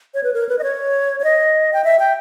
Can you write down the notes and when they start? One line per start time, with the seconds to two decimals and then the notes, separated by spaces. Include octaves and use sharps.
0.14 C#5
0.23 B4
0.34 A#4
0.49 B4
0.59 D#5
0.63 C#5
1.20 C#5
1.24 D#5
1.73 G5
1.84 E5
1.99 G5